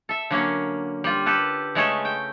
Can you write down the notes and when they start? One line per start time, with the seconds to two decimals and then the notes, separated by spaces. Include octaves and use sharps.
0.09 A4 E5
0.30 D3 F#3 A#3 C#4
1.04 G3 F4
1.26 G4 A4 B4
1.75 C#3 G#3 A3 C#4 A4 G#5
2.05 G5